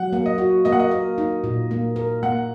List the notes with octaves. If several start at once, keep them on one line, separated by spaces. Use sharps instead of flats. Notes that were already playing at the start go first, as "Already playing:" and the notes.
Already playing: F#3 F#5
A#3
D#5
F#4
A#3 D#5
F#5
D#5
A#4
D#4
A#2
A#3
A#4
A#3 F#5